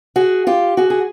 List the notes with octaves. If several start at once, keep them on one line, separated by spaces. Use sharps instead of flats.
F#4 G#4
F4 G4
F#4 G#4
G#4